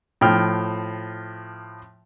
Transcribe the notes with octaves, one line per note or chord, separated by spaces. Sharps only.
A2 F3 G5 F6